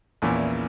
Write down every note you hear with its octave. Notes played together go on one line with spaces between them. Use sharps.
A#1 E2 A#2 E3 A#3 C#4 E4